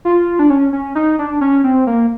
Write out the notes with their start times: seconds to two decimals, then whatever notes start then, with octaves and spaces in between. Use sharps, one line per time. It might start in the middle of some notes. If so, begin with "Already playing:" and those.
0.05 F4
0.39 D4
0.50 C#4
0.73 C#4
0.95 D#4
1.19 D4
1.41 C#4
1.64 C4
1.87 A#3